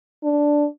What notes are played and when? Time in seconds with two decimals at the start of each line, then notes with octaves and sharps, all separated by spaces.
0.24 D4